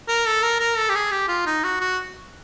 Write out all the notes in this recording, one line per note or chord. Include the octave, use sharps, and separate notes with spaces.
A#4
A4
A#4
A#4
A4
G4
G#4
G4
F4
D#4
F#4
F#4